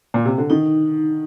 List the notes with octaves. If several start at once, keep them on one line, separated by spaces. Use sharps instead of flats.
A#2
C3
D3
D#3 D#4